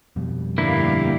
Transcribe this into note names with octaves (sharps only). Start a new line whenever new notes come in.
F2 B2 G3
G2 D3 A#3 E4 G4 F5